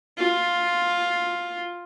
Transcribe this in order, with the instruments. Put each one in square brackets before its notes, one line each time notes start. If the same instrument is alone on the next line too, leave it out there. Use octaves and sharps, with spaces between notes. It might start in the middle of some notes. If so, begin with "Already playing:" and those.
[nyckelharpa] F4